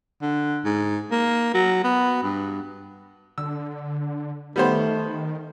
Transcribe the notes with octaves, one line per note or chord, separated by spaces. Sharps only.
D3
G#2
A#3
F#3
B3
G2
D3 E6
D#3 G3 A3 B3 C5